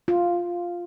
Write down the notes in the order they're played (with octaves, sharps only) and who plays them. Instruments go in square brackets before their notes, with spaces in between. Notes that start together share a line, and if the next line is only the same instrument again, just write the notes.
[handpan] F4